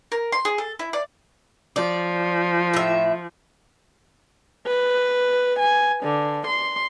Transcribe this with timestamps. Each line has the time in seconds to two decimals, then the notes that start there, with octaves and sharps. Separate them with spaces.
0.12 A#4
0.32 C6
0.45 G#4
0.58 A4
0.79 E4
0.93 D5
1.76 F3 D5
2.74 A2 E5
4.67 B4
5.59 G#5
6.04 D3
6.47 C6